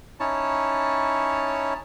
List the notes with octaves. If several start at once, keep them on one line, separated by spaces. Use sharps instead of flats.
C#4 D#4 E4 C#5 A5